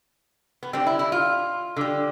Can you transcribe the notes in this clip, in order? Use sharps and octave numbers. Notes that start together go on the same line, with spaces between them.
B3
D3 G3 C4
E4
E4
F4
D3 G3